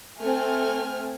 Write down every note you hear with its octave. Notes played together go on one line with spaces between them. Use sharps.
A3 C4 A4 G#5 F6